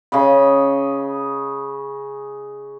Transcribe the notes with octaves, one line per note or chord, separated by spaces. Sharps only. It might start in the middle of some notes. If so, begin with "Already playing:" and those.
C#3 D#5 B5